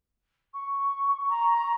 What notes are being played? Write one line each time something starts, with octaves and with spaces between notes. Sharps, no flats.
C#6
A#5